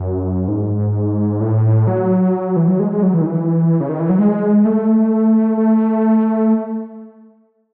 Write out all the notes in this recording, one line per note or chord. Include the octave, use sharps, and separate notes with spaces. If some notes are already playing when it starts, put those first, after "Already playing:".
Already playing: F#2
G#2
A2
F#3
E3
F#3
G#3
G#3
F#3
E3
D#3
E3
C#3
D#3
E3
F#3
G#3
A3
A3